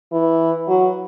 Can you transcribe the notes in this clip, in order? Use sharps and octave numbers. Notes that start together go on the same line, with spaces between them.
E3
F#3